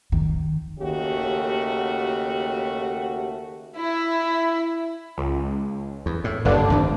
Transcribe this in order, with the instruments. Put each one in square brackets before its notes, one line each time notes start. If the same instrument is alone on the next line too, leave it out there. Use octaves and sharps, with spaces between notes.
[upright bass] D#3
[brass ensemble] D#2 C#3 A3 F#4 G4
[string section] E4
[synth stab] C#2
[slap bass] E2
A2
[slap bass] F#1 B2 [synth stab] G2 D3 D4
[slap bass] G#1 F2